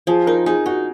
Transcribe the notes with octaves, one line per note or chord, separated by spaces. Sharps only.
F3 G#4
D#4 A#4
D#4 G#4
D#4 F#4